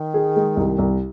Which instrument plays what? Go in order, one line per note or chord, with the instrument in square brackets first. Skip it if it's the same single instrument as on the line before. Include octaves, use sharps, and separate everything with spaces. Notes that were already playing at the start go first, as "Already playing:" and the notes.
Already playing: [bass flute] D#3
[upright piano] G#4
G#3
C2
C2